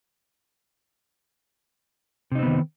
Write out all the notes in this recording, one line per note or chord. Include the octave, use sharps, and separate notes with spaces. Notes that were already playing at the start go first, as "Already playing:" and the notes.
C3 D#3 B3 C4 D#4